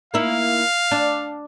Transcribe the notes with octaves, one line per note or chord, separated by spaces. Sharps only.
A#3 D#4 E4 F5
D4